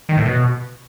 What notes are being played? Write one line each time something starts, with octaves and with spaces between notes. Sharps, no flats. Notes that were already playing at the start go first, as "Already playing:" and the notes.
D#3
A2
B2